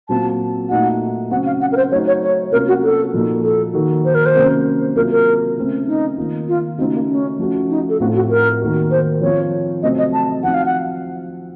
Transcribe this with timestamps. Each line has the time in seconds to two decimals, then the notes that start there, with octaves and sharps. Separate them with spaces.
0.09 A#2 F#3 C4 F4 A5
0.69 A#2 A3 D#4 F#4 F#5
1.31 C#3 F#3 C4 F#4 F#5
1.46 F5
1.61 F#5
1.72 A#4
1.77 C5
1.91 F#3 A3 D#4 F#4 C#5
2.07 C#5
2.22 C#5
2.52 C3 F#3 A#3 C#4 F4 A#4
2.68 F#4
2.83 A4
3.13 A#2 F3 A#3 D#4 F#4
3.44 A4
3.74 D#3 A#3 D#4 F#4
4.05 C5
4.15 A#4
4.26 C5
4.34 C3 F#3 A#3 C#4
4.96 C3 F#3 A#3 F4 A#4
5.11 A#4
5.56 C#3 A3 C4
5.87 D#4
6.17 D#3 A#3 F4
6.48 F4
6.78 C#3 A3 C4 D#4 F#4
6.93 A#3
7.08 C#4
7.39 F3 A3 C#4 F#4
7.70 D#4
7.89 A4
8.00 A2 A3 C4 F4 F#4
8.15 F#4
8.30 A#4
8.61 D#3 A#3 D#4 F#4
8.91 C5
9.21 F3 C4 F4 C#5
9.83 C3 F#3 A3 C4 D#5
9.98 D#5
10.13 A5
10.43 F3 C4 D#4 F#4 F#5
10.54 F5
10.66 F#5